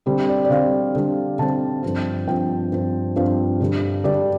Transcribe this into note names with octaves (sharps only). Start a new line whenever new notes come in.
D3 G3 C4
D5
D5
D3 G3 C4 F5
D3 G3 C4
D3 G3 C4 A5
G2 F3 C4
G2 F3 C4 G5
G2 F3 C4
G2 F3 C4 F5
G2 D3 G3
G2 D3 G3 D5